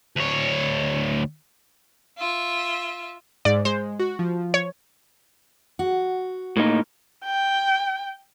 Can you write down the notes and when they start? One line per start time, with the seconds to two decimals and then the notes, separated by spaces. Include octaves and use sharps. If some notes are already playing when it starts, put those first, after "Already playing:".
0.16 D2 C#5
2.18 F4 E5
3.45 G#2 D5
3.65 G#3 C5
3.99 F#4
4.19 F3
4.54 C#5
5.79 F#4
6.57 A2 A#3 D#4
7.24 G5